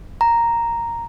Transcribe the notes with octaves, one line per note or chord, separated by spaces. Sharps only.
A#5